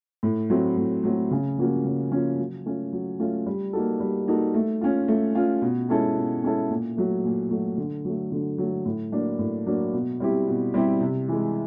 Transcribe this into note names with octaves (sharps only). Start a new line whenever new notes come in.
A2
F#3 A3 C4
A2
F#3 A3 C4
C#3
F3 A#3 C#4 F#4
C#3
F3 A#3 C#4 F#4
F#3
A3 C#4 F4
F#3
A3 C#4 F4
G3
A#3 D#4 F#4 A4
G3
A#3 D#4 F#4 A4
A3
C#4 F4
A3
C#4 F4
B2
G#3 C#4 E4 A4
B2
G#3 C#4 E4 A4
A#2
F#3 A3
A#2
F#3 A3
D3
F#3 A3
D3
F#3 A3
A2
F#3 A#3 D4
A2
F#3 A#3 D4
B2
G3 C4 E4 G4
B2
G3 C4 E4 G4
C3
E3 G#3